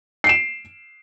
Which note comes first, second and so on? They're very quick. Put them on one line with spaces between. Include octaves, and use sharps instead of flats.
C7 D7 E7